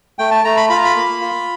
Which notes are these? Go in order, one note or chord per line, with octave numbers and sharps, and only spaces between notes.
A3 G5
A5
A3 A#5
B5
F4 B5
A#5
B5
A#3
F4